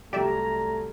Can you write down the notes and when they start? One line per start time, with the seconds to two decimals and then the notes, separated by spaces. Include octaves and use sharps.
0.13 C2 F#3 A3 G4 D5 E5 A#5